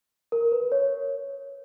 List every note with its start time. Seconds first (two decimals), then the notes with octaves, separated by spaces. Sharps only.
0.32 A#4
0.52 B4
0.72 C#5